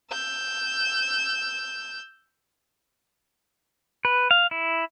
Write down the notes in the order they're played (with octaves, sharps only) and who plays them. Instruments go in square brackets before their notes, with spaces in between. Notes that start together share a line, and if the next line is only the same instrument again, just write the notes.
[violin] E6 G6
[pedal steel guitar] B4
F5
E4